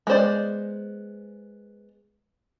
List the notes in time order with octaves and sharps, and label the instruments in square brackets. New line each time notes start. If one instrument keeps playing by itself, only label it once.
[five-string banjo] G#3 B3 C5 D5